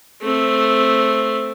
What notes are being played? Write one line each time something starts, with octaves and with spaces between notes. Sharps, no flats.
A3 C4